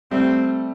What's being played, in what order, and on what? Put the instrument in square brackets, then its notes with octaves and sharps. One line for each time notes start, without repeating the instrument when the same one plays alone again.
[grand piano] G3 A3 [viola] C4